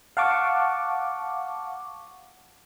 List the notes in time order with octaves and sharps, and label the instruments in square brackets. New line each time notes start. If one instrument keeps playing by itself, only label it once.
[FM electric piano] F5 F#5 A5 C#6 D6